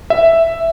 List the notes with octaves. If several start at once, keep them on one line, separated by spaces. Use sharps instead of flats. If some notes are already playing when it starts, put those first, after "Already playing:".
E5